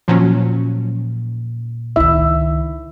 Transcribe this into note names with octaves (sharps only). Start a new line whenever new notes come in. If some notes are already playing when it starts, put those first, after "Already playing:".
A#2 F3 F#3 C#4
C#2 D#3 E4 E5